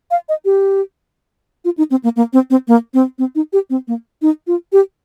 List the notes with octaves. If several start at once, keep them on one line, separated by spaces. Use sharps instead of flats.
F5
D#5
G4
F4
D#4
C4
A#3
A#3
C4
C4
A#3
C4
C4
D#4
G4
C4
A#3
D#4
F4
G4